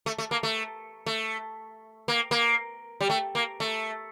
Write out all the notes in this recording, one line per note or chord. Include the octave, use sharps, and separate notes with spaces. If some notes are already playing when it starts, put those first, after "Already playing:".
A3
A3
A#3
A3
A3
A#3
A#3
G3
A3
A#3
A3